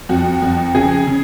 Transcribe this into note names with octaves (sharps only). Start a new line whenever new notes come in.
F2 F#4
F2
C#3 G#4
C#3